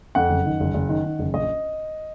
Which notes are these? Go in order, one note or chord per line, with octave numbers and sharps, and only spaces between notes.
F2 F#5
F#1
D#3
F#1
F#1
D#3
D#3
F#1
A#1 D#5